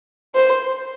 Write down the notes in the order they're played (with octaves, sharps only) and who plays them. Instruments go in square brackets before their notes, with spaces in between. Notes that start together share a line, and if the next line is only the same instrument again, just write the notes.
[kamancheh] C5